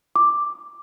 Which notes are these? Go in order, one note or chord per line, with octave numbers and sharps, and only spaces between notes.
D6